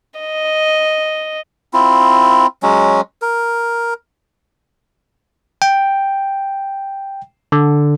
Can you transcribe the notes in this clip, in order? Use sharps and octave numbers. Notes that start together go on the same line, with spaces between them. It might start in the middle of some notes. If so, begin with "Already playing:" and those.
D#5
C4 E4 F4
F#3 G#3 C#4
A#4
G5
D3